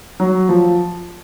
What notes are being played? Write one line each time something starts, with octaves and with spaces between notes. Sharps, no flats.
F#3
F3